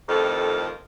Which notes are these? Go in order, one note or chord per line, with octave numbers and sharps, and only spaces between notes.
F2 A2 D#3 G3 F4 A4